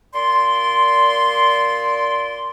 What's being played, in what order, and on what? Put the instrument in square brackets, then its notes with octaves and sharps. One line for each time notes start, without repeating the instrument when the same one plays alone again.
[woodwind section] A#2 D5 C6